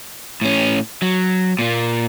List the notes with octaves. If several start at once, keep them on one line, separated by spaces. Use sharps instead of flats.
A2 C#4
F#3
A#2 A#3